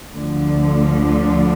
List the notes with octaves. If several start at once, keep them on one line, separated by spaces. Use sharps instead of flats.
D2 D3 F3